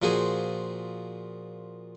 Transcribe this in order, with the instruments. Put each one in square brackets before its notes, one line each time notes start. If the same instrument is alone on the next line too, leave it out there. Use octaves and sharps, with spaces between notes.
[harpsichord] A#2 F3 F#4 G#4 C5 G#5